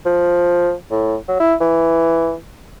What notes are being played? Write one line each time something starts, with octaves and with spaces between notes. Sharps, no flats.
F3
A2
F#3
E4
E3